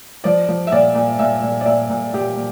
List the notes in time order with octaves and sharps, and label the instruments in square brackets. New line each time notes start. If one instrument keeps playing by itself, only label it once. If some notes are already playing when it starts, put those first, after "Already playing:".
[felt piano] F3 D5
F3
E5
A#2 D5
A#2
A#2 E5
A#2
D5
A#2 E5
A#2
A#2 G4
A#2